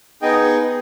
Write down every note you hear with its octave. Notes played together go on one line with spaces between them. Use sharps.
B3 D#4 G#4 D#5 G5